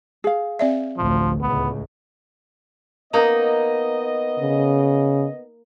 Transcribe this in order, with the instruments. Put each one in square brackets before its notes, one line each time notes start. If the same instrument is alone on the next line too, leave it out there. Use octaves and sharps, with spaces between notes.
[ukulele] G#4 F5
[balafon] C4 D5 E5
[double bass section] A1 D2 [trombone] F3
[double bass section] C#2 A2 [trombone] B3
[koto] A#3 D#4 [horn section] B3 D#5
[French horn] C#3